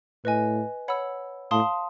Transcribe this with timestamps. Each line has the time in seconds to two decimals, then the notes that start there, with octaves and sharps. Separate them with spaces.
0.25 A2 B4 D#5 G#5
0.88 C#5 F#5 B5 E6
1.51 A2 F5 A5 C6 D#6